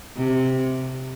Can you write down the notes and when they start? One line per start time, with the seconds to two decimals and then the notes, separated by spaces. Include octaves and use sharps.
0.17 C3